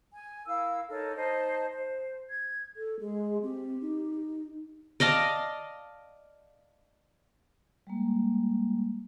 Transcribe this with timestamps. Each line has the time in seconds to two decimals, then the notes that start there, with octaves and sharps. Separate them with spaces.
0.11 G#5
0.46 E4 A#4 F5 E6
0.88 D#4 A4 A#4 C#5
1.15 D#4 C5 D#5 A5
1.72 C5
2.27 G#6
2.77 A4
3.01 G#3 G#4
3.43 C4 G4
3.81 D#4
5.00 D5 D#5 F5 A5
7.87 G3 G#3 A#3